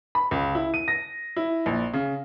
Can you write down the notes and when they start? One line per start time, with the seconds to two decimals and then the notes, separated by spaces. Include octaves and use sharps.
0.15 B5
0.31 C#2
0.55 E4
0.74 D#7
0.88 A#6
1.37 E4
1.66 A#1
1.94 C#3